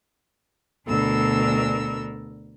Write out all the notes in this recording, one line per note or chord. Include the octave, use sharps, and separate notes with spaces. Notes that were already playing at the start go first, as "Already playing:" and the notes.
D2 B2 D4 A4 A#4 E6